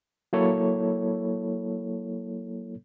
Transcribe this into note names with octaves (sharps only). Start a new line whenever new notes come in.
F#3 A#3 E4 A4 C#5